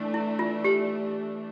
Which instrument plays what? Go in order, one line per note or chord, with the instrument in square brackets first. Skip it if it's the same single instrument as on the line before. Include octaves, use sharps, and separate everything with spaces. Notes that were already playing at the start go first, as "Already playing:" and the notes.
Already playing: [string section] E3 A3 D4
[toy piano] E4
F4
G4